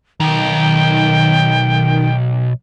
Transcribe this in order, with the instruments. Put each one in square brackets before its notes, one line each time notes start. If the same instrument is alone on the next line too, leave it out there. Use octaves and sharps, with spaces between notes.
[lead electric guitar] B1 [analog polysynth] D#3 [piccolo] G5